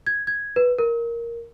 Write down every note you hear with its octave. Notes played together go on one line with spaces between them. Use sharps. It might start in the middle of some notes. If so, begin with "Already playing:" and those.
G#6
G#6
B4
A#4